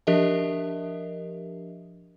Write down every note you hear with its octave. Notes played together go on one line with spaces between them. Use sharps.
F3 D4 G4 A#4 D#5 E5